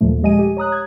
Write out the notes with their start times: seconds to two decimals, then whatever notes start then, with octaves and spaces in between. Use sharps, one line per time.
0.01 D#2 A#2 F3 A3
0.23 G#3 G4 D#5 G#5 D#7
0.39 G4
0.57 C#5 A#5 D#6 F#6
0.72 G#6